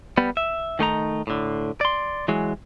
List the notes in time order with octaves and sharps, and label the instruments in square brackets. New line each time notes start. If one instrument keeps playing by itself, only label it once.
[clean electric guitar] G3 B3
E5
D#3 A3 D#4 A#5
A2 D3
D5 C6
E3 F#3 G#3